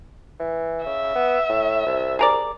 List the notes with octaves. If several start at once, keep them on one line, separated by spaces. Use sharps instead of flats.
E3
C#3 E5
B3
A2
C2
G#4 A#4 D5